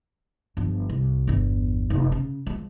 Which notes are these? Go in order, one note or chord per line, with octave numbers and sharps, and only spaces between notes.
G1 F3
C2
G1 E2
F1 F2
C#3
F3 G#3